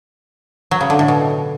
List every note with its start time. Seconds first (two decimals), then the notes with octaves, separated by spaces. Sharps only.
0.71 F#3
0.81 C#3
0.90 D3
0.99 A2
1.08 B2